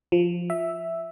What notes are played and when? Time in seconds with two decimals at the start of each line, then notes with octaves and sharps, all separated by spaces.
0.12 F3
0.50 E5